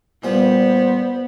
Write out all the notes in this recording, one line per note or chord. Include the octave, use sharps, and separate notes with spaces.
A#2 G3 B3 C5